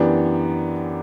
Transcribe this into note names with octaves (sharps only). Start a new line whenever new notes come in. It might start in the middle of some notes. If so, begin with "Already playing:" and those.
Already playing: F#2 E3 B3 D4 G4